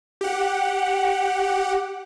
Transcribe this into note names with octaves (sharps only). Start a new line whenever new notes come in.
G4 F#5